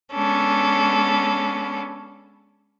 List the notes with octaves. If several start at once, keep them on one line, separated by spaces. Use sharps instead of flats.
G#3 B3 C#4 D4 A4